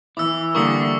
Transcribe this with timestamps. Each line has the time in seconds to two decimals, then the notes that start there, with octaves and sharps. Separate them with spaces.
0.17 E3 E4 D6 E6
0.55 D3 G3 A#3 E4 A#4 C#6 D#6 C#7